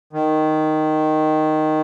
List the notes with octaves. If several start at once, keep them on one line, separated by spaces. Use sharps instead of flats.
D#3